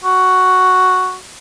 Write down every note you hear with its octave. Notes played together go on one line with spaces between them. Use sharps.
F#4